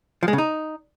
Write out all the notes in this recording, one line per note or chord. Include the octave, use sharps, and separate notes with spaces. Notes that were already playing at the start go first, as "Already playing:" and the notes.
F3
G#3
C#3
D#4